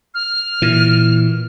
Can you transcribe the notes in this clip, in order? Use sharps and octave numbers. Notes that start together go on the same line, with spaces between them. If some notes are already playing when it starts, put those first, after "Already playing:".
F6
A#2 E3